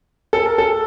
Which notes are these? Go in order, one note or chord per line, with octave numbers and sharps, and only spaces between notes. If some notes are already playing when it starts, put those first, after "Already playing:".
A4
A#4
A4